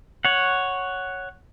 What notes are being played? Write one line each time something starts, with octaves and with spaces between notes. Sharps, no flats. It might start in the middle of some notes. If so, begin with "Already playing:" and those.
C#5 F#5